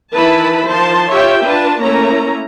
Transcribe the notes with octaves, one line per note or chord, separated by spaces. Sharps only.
D#3 E3 E4 B4 A5 B5
D#3 F3 C5 A5 C6
F4 G4 C#5 E5 G5
D4 F4 B4 A5
A3 A#3 C#4 E4 A#5